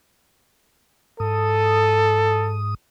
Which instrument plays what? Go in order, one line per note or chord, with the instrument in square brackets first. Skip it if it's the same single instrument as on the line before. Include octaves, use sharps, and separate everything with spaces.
[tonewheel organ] G#2 D#6 [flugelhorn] A4